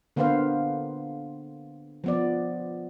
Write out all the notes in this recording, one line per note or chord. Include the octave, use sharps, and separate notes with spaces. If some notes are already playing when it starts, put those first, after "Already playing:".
D3 A#3 B3 B4 C5 F5
F3 B3 D5